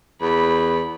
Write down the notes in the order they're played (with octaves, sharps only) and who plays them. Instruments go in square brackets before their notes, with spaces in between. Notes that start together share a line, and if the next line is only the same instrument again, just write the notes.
[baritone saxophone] E2 [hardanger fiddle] B5